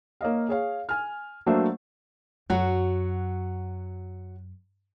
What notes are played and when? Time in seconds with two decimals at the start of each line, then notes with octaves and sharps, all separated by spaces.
0.21 A#3 C#5 D#5 F5
0.49 G#4 C#5 F5
0.89 G#5 F6
1.46 F#3 A3 A#3 D4 C5 E5
2.50 F#2 F#3 F#4 F#5